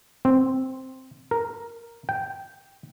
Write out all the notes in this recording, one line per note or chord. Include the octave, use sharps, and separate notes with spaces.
C4
A#4
G5